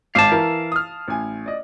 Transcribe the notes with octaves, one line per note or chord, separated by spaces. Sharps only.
G#1 F5 A5 D6
E3 E4 A#4
D#6 F6
A1 G#5
D5 D#5